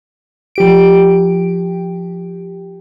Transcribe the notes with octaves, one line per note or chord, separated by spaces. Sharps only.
F3 G4 D7